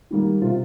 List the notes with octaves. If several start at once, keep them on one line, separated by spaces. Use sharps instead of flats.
D#3 G3 A#3
C3 F4